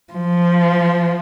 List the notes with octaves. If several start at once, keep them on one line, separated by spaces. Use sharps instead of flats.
F3